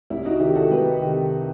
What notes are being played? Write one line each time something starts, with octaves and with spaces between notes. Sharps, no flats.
C2 E4
D#4 F#4
C3 D#3 E4 G4
F#4 A4
C2 G4 B4
C3 D#3